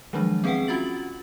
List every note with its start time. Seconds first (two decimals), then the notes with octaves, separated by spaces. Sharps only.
0.13 D#3 F3 F#3 G#3 D4
0.44 B3 C4 G#4 B4 F#5 G5
0.68 C#4 F4 F#4 A6 F#7